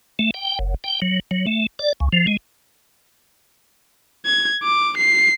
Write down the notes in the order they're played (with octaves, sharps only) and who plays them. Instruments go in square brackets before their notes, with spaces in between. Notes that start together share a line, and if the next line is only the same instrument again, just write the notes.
[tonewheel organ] A3
G5
F#1
G5
F#3
F#3
A3
D5
C#2
F3
G#3
[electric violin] G#6
D6
C7